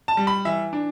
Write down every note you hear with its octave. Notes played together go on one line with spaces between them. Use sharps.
A5
G3
B5
E3 E5
D4